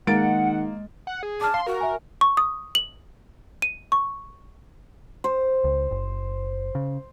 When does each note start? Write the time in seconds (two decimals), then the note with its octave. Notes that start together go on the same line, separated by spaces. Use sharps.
0.07 D#3 G#3 A#3 F#5 A6 D7
1.07 F#5
1.23 G#4
1.41 A5 D6 F6
1.54 F5 C6
1.67 F#4 A#4
1.81 E5 G#5
2.21 C#6
2.37 D#6
2.75 F#7
3.62 D#7
3.92 C#6
5.24 C5
5.64 C#2
5.91 F#1
6.75 C#3